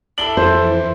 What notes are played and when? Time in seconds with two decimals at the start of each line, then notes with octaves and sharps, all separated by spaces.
0.18 D4 E4 A4 F#7 G7
0.37 F2 E3 C5